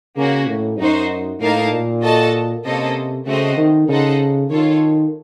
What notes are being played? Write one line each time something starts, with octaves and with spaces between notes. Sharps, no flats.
C#3 A#3 C#4 F#4
A2
F#2 D#4 F#4 C5
A2 A#3 D#4 A#4 F5 A5
A#2
F#4 A4 D#5 A5
C3 A#3 C#4 A4 C5 D#5
C#3 A3 C4 F#4 C5 D#5
D#3
C#3 D#4 A4 C5 D#5 F#5
D#3 F4 A4 C#5